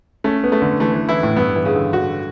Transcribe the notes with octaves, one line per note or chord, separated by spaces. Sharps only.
A3 C#4
B3
A3
D3
E3 A3
E3
E3 E4
A2
G2 B3
E3
C#3
D3
D3 F#4